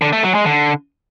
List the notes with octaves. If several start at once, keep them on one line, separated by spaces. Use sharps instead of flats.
D3
A3
F#3
G#3
D3